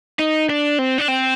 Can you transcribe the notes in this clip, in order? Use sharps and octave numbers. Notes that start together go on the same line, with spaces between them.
D#4
D4
C4
D4
C4